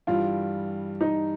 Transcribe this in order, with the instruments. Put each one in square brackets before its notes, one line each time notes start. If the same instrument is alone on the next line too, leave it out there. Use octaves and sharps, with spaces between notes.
[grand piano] G2 E3 G3 [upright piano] F4
[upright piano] D#4